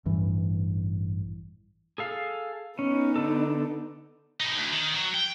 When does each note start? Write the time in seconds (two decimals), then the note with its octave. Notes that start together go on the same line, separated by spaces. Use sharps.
0.06 A1 G2 E3
1.98 G#4 A4 F5
2.79 B3 C#4 D#4
3.16 D3 A4
4.40 A2 D#4
4.56 D2
4.72 D#3
4.95 F#3
5.14 G5